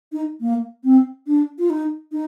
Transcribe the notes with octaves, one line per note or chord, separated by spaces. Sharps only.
D#4
A#3
C4
D4
F4
D#4
D#4